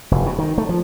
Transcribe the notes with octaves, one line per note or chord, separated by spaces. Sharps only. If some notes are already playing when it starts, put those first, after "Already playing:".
F1
B2
D#3
A3
F3